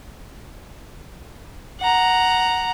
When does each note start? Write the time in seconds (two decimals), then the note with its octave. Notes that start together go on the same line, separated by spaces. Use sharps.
1.81 F#5 A#5